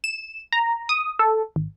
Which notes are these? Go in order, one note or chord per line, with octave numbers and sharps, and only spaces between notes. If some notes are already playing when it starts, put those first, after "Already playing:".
E7
A#5
D#6
A4
G#1